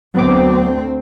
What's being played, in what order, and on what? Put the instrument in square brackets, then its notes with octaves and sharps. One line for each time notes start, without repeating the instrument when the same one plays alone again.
[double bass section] D2 C4 [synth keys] F#3 B3 D6